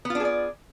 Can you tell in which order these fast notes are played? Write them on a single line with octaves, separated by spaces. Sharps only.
B3 F4 D4 G#4 D5